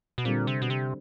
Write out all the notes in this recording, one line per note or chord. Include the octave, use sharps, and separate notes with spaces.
B2
A#2 D3 G3 C4
C3
B2
C3